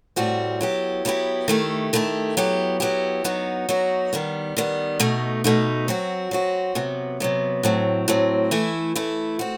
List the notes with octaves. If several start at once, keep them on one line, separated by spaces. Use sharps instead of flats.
A2 G3 C4 F#4
F#3 B3 E4 G4
F#3 B3 E4 G4
D#3 A3 E4 G4
D#3 A3 E4 G4
F#3 B3 E4 G4
F#3 B3 E4 G4
F#3 B3 D#4 F#4
F#3 B3 D#4 F#4
D#3 G3 B3
D#3 G3 B3
B2 A3 D#4
B2 A3 D#4
F#3 C4 F#4
F#3 C4 F#4
C3 F#3 B3
C3 F#3 B3
A2 F#3 C4
A2 F#3 C4
E3 A3 E4
E3 A3 E4
C4 F#4